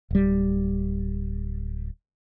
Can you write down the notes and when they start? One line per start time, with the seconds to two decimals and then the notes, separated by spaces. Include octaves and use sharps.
0.11 D1 G3